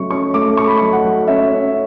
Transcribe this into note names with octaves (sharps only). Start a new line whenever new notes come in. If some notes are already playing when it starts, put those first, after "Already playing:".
Already playing: C#3 F#3 A3 C#4 C#6
C#4 C#6
A3 D6
A3 C#6
B5
F#3 C#6
F#5
F#3
C#4 E5
C#4